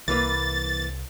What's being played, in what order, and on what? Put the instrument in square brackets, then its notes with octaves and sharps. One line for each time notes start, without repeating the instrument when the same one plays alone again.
[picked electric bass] C2 [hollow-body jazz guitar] E3 A#3 B4 [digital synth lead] A6